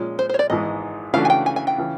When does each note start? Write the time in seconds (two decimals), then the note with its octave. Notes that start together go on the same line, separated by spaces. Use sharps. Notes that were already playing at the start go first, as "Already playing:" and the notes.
Already playing: A#2 F3 G#3 C#4
0.19 C5
0.29 C5 C#5
0.39 D5
0.50 G#1 G#2 E3 G#3 D#5
1.14 C#3 E3 A3 D4 F#4 F5
1.25 G#5
1.30 G5
1.46 G#5
1.56 G#5
1.67 G5
1.78 C#3 E3